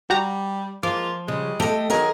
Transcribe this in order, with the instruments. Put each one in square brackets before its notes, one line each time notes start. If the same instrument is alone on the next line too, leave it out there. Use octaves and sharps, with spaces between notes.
[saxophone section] G3 [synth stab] F#4 G4 A#5
[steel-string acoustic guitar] F3 [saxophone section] G#3 A#3 F4 [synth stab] D6
[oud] C#3 [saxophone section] G3 G#3
[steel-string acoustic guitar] A3 D#5 [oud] G4 A4
[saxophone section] D#3 F#3 [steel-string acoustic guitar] G#4 A#4 D#5